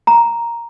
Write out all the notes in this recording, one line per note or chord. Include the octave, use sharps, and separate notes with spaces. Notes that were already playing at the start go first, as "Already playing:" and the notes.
A#5